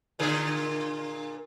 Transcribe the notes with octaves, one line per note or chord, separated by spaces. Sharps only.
A#2 D3 G#4